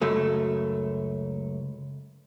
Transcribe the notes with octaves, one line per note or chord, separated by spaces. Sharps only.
C#2 F#2 A3